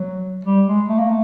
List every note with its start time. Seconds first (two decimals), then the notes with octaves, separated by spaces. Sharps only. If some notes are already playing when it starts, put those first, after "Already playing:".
Already playing: F#3
0.45 G3
0.66 G#3
0.88 A3
0.98 A#3
1.09 A3